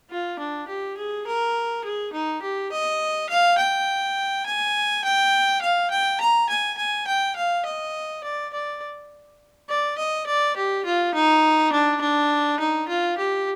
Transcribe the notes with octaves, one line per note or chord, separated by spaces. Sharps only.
F4
D4
G4
G#4
A#4
G#4
D#4
G4
D#5
F5
G5
G#5
G5
F5
G5
A#5
G#5
G#5
G5
F5
D#5
D5
D5
D5
D#5
D5
G4
F4
D#4
D4
D4
D#4
F4
G4